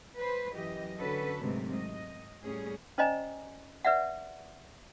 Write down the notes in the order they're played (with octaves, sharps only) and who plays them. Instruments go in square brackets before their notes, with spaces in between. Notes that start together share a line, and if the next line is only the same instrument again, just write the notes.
[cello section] B4 C5
F#2 E3 G4 D#5
D3 F#3 C#4 F#4 A4 B4
G#2 C3 D#3 F#3 A3
D#5
A2 G3 C#4 G#4
[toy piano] C#4 C5 D5 D#5 G#5 A#5
B4 D5 E5 F#5